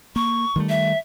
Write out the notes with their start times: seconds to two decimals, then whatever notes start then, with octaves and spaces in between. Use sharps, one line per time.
0.16 A#3 C#6
0.56 D#3 G3 A3
0.69 E5